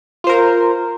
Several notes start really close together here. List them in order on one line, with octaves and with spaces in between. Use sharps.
F4 C5 A#4